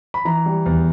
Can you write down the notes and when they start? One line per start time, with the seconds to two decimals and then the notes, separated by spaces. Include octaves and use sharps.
0.14 B5
0.25 E3 A#5
0.46 G3
0.66 E2